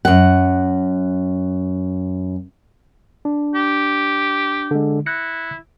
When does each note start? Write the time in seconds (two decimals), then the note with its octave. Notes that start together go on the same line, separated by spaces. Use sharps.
0.05 F#2 F#5
3.25 D4
3.55 G4
4.71 D3 G#3
5.06 E4 F#6 A#6 C#7